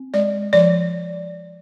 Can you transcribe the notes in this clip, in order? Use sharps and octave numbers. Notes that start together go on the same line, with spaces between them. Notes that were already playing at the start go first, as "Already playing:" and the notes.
Already playing: C4
G#3 D5
F3 D5